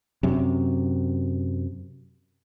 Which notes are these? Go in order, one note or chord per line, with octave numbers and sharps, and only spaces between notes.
F#2 C3